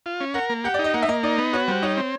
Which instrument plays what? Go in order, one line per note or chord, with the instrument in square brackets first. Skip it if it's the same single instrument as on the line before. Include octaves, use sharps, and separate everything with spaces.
[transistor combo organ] F4
C#4
[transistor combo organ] A#4 [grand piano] F#5
[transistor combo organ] A#3
[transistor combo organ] G4 [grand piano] F#5
[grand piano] D5
[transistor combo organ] D#4
[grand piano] D#5
[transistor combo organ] A#3 [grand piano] F#5
[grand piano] E5
[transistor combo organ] A#3 [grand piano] D#5
[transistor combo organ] D#4 [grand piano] D5
[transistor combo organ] B3
[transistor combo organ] F#4 [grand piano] C#5
[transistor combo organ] G3 [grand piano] C5
[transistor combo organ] D#4 [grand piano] C#5
[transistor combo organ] C4